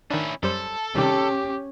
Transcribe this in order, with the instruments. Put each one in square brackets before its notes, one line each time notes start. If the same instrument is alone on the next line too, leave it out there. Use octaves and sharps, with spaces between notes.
[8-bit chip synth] D#3 D4 [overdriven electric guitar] C#4 E4
[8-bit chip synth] F#2 G3 C5 [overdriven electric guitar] A4
[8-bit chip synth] C3 D#3 G3 [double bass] C#4 [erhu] G4